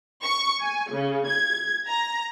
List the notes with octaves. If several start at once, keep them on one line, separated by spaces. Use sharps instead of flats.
C#6
G#5
C#3
G#6
A#5